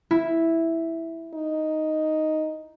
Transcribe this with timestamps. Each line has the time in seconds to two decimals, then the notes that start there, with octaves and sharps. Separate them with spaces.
0.11 E4
1.34 D#4